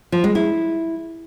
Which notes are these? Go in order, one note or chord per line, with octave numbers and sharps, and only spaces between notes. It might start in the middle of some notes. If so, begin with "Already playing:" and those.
F3
G#3
E4